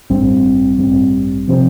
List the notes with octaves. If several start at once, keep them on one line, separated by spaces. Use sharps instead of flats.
A1 G2 G3 C4
A1 G2 G3 C4
C3 F3 C4 G4 C5